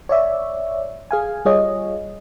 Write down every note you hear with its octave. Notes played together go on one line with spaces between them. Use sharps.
C#5 D5 E5
G#4 F5 G#5
G3 F4 G#4 C#5 D#5